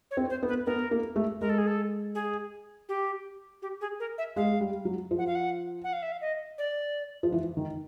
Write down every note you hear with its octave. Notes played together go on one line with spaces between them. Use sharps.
C#5
C4
C5
B3
B4
B3 A#4
A#3
A3
G#3 A#4
A4
G#4
A4
G#4
G4
G4
G#4
A#4
E5
G#3 F5
G3
F#3
F3
F#5
F5
F#5
F#5
F5
E5
F5
D#5
D5
F3
E3
D#3